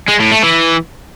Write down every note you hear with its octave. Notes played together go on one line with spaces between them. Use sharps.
G#3
A2
A3
E3